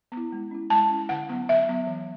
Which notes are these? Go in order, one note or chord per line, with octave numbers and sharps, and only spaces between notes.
B3
E4
G#3
C#4 E4
G#3 A5
C#4 E4
D3 F#5
F#3 B3
D3 E5
F#3 B3
E3